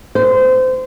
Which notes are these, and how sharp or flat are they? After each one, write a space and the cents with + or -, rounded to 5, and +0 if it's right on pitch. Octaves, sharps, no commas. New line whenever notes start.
C5 -25